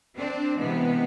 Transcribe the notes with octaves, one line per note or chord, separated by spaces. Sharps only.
C4 D4
C3 E3 G#3 B3